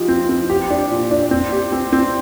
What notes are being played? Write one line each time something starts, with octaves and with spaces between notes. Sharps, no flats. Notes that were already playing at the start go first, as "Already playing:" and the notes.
Already playing: F3 D#4 G4
C4
C4
G4
D4
A#2
D4
C4
G4
C4
C4